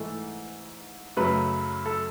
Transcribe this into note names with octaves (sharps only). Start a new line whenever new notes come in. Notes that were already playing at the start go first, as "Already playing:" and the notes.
Already playing: G#2 E3 A3 A4
F#2 C#3 F#3 A3 B4
A4